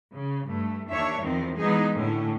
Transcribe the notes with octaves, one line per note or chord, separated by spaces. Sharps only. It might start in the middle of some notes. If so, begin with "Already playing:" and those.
C#3
G2 A3
D#2 D4 C#5 E5
E2 D#3 F3 C4
E3 G#3 B3 D#4 G#4
A2 D3 C#4